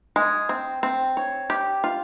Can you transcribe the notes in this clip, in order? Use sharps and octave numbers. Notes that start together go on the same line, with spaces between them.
G#3
C4
C4
C#5
G4
F4